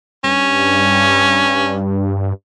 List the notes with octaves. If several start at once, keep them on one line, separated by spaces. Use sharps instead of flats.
G2 C#4